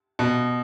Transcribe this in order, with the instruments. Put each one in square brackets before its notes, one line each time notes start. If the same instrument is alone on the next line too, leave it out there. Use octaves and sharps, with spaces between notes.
[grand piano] B2